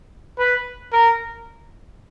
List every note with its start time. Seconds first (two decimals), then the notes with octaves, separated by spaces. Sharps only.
0.39 B4
0.93 A#4